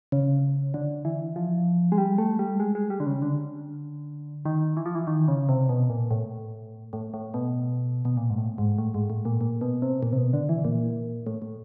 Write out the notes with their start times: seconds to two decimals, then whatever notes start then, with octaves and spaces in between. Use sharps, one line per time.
0.12 C#3
0.74 D3
1.05 E3
1.36 F3
1.92 G#3
1.98 G3
2.18 A3
2.39 G3
2.60 G#3
2.75 G#3
2.90 G3
3.00 D3
3.06 C#3
3.22 D3
4.45 D#3
4.77 E3
4.86 F3
4.95 E3
5.07 D#3
5.28 C#3
5.49 C3
5.69 B2
5.90 A#2
6.11 A2
6.93 A2
7.14 A2
7.34 B2
8.05 B2
8.17 A#2
8.30 G#2
8.38 A2
8.58 G#2
8.78 A2
8.94 G#2
9.10 A2
9.25 A#2
9.41 A#2
9.61 B2
9.82 C3
10.03 A#2
10.13 C3
10.18 B2
10.33 D3
10.49 E3
10.65 A#2
11.27 A2
11.42 A2